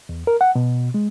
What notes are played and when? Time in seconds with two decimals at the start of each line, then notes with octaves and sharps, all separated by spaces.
0.09 E2
0.27 A#4
0.41 F#5
0.55 B2
0.94 G#3